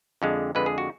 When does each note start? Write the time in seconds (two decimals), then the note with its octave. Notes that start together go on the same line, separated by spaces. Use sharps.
0.22 F2 D3 G#3
0.55 F2 D3 G#3 B4
0.66 G#4
0.78 F#4